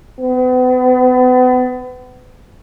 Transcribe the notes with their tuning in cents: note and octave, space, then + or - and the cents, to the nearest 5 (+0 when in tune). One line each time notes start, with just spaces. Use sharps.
B3 +40